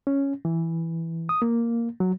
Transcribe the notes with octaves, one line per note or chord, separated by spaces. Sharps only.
C#4
E3
D#6
A#3
F#3